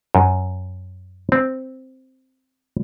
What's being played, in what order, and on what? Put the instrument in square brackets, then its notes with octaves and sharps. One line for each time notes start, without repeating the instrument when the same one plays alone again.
[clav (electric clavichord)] F#2
C4